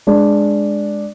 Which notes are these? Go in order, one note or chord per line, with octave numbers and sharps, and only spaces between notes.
G#3 D4